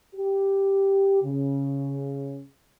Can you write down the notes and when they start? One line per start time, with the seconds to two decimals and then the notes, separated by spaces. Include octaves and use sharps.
0.15 G4
1.23 C#3